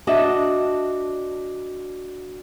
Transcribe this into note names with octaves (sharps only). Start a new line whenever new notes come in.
D4 F#4 D#5 E5 A5